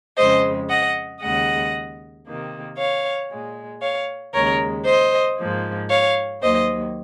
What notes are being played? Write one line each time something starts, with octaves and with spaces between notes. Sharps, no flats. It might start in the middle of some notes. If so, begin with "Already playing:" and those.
F2 C#3 G#3 C5 D#5
D#5 F#5
D#2 C#3 G#3 D#5 F#5
C3 D#3 A#3
C#5 F5
A#2 G#3
C#5 F5
D#2 C#3 G#3 A#4 C#5
C5 D#5
G#2 F3 A#3
C#5 F5
D#2 D#3 F#3 A#3 C5 D#5